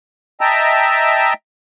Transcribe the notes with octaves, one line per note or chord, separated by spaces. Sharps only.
D#5 E5 G5 A5 A#5 E6